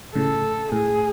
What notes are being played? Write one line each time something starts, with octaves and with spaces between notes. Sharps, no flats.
A2 C#3 A4
A2 G#4